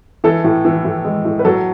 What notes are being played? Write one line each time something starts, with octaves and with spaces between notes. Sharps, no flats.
E3 A4
A2
E3
A2
G#3
A2
B4
F#3 A4